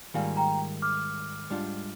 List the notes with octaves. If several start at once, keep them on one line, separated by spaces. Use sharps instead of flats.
G#2 D#3 G3 A#3 F4 F5 G#5
G5 A#5
D6 F6
G#2 G3 D4 F4